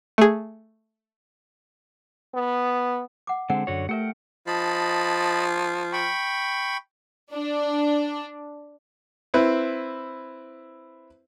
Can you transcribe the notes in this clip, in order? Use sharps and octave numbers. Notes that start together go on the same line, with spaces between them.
A3 G#4
B3
F#5 D6
D3 G#3 C4 F#5
F#2 D3 F#4 C#5
A3 G4 A#4 E5 F#5 G5 F6
F3 D#5 A5 B5
G5 B5 C#6
D4
C4 E4 B4